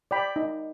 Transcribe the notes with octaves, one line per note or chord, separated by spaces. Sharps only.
D5 G5 B5
D#4